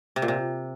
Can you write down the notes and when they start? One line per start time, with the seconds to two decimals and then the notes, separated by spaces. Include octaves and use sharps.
0.16 C3
0.22 A#2
0.28 C3